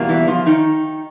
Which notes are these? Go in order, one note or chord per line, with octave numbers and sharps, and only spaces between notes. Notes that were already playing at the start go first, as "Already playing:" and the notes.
Already playing: E2 B2 G3 A#3
E3 E4
F3 F4
D#3 D#4